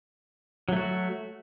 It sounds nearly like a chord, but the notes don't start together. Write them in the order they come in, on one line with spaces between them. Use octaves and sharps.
F#3 A3 F#4